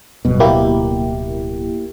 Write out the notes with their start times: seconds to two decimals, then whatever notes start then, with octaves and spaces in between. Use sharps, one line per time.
0.25 D1 G2 B2
0.40 A#3 E4 G4